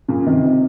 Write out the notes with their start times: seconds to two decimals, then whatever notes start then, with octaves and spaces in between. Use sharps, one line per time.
0.08 A#2 C#3
0.27 C3 D#3
0.44 C3